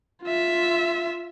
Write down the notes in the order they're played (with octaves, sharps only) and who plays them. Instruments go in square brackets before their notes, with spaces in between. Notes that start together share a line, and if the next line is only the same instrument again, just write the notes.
[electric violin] F4 E5